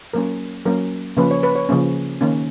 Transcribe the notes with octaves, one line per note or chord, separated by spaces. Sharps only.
F#3 A#3 C#4 A#4
F#3 A#3 C#4 A#4
C#3 F3 A#3 C#4 B4
C#5
B4
C#5
C#3 F3 A#3 C#4
D#3 A#3 C#4